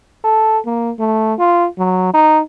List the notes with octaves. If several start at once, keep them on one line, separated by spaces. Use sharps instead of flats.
A4
A#3
A3
F4
F#3
D#4